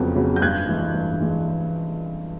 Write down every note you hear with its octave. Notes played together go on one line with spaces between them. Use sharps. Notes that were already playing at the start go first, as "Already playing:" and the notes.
Already playing: F2 C#3 F#3 B3
C#3 F#3 B3
G6
G2 F#6 G#6
E3 G#3
G2
E3 G#3